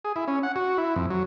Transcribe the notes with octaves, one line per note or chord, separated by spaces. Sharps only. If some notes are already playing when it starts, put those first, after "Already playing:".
G#4
E4
C#4
F#5
F#4
E4
F2
F#3